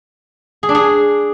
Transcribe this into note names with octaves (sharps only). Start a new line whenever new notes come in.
G#4
D4
G#4